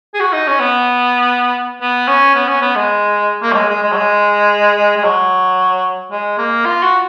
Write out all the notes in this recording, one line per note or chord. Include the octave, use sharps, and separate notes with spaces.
G#4
F#4
D#4
C#4
B3
B3
C#4
B3
C#4
B3
G#3
A#3
F#3
G#3
G#3
G#3
F#3
G#3
G#3
F#3
G#3
A#3
F4
F#4